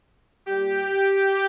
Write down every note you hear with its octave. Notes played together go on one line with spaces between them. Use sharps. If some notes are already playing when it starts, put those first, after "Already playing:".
A#2 G3 G4